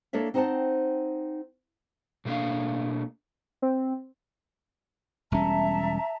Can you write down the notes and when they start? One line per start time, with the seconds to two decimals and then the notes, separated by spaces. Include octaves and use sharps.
0.13 A#3 D4 A4 C#5 E5
0.34 C4 D#4 C5 F#5 G5 A5
2.25 B2 A3 A#3 D4 F5
3.62 C4
5.32 E1 G3 C#4 E5 A5 A#5